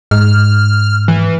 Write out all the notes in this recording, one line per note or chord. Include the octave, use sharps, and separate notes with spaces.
G#2 F6
E3